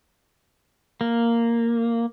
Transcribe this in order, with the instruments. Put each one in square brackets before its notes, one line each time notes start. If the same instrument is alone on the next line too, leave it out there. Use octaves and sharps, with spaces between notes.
[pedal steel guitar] A#3